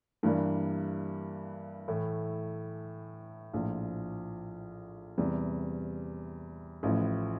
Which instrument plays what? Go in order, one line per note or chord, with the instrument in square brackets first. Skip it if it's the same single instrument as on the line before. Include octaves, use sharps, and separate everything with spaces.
[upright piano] G2 E3 G3 A#3
A2 E3 A3 E4
A#1 A2 F3
E2 C3 G3
A1 A2 F3